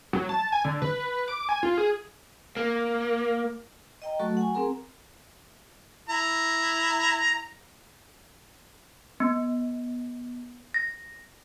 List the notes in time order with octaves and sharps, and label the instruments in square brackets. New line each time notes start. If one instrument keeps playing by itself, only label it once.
[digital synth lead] F#3
A5
G#5
D3
B4
D6
G#5
F4
G#4
[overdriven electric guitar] A#3
[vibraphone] D#5 G5 A#5
F#3 A3 F#4 A4 C#6
F#5 G#5
C4 G#4 A#4 A#5
[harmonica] E4 A#5
[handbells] B3
A#6